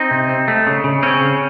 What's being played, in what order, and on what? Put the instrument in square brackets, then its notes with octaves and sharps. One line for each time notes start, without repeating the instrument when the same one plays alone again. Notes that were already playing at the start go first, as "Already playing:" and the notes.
Already playing: [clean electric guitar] C4 D#4
C3
C4
A3
C#3
C#3
C4 C#4
C#3